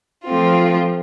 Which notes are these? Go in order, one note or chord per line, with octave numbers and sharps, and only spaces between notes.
F3 A3 C4 F4